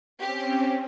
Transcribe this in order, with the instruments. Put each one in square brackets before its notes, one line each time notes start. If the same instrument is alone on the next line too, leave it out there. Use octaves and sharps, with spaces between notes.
[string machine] C4 C#4 [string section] G4